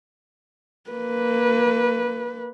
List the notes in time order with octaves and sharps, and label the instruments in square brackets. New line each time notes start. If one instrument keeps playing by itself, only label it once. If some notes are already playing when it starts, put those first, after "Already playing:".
[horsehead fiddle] A#3 B4